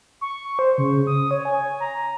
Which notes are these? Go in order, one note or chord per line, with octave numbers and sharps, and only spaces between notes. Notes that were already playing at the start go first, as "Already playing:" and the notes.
C#6
C5
C#3
D#6
C#5
G#5
A#5